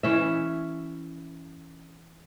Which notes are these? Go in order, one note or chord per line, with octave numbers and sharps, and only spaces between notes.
E3 C#4 E5